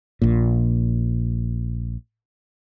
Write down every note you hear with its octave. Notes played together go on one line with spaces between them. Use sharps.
A#1 A#2